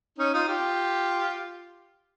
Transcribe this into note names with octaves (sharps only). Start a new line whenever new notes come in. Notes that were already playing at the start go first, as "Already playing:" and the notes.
C#4 D#4
D#4 F4
F4 G4